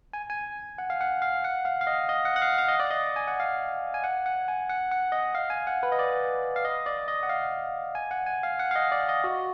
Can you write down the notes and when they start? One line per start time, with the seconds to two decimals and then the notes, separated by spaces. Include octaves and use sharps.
0.13 G#5
0.30 G#5
0.78 F#5
0.90 F5
1.01 F#5
1.22 F5
1.44 F#5
1.65 F5
1.81 F5
1.87 D#5
2.09 D#5
2.25 F#5
2.36 F#5
2.42 F5
2.58 F5
2.68 D#5
2.80 D5
2.90 D#5
3.16 G#5
3.28 F#5
3.40 F5
3.94 G#5
4.04 F#5
4.26 F#5
4.48 G#5
4.70 F#5
4.92 F#5
5.12 D#5
5.35 F5
5.50 G#5
5.67 F#5
5.83 B4
5.92 D#5
5.99 D5
6.56 F5
6.65 D#5
6.86 D5
7.08 D#5
7.23 F#5
7.29 F5
7.95 G#5
8.11 F#5
8.26 G#5
8.43 F5
8.59 F#5
8.71 F5
8.76 D#5
8.92 D5
9.09 D#5
9.24 F#4